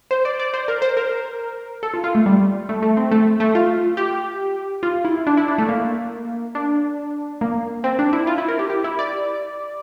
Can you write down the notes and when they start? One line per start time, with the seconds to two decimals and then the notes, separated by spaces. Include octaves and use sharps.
0.11 C5
0.25 D5
0.40 D5
0.54 C5
0.68 A#4
0.82 C5
0.97 A#4
1.83 A4
1.94 F4
2.04 F4
2.15 A3
2.26 G3
2.69 A3
2.82 A3
2.97 C4
3.11 A3
3.40 A3
3.55 F4
3.97 G4
4.83 F4
5.05 E4
5.27 D4
5.37 E4
5.48 D4
5.58 A3
5.69 A#3
6.55 D4
7.41 A#3
7.84 C4
7.99 D4
8.13 E4
8.27 F4
8.38 E4
8.48 A#4
8.59 G4
8.70 G4
8.84 E4
8.99 D5